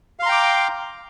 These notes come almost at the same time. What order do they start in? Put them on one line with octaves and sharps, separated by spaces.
F5 C6 A#5 G5 D6